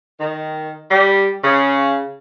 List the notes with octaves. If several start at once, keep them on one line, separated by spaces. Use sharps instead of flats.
D#3
G3
C#3